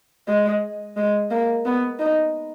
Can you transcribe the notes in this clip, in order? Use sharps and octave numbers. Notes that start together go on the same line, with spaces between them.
G#3
G#3
A#3
B3
D#4